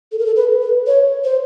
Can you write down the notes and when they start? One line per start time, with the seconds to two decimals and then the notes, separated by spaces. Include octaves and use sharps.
0.12 A4
0.19 A#4
0.26 A4
0.36 B4
0.62 B4
0.87 C#5
1.24 C5